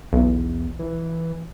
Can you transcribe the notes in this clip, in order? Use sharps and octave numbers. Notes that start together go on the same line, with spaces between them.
B1 E2
E3